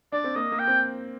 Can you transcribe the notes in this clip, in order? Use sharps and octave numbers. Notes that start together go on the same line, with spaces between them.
D4 D5
C4
A#3 D#5
A#3
G5
C4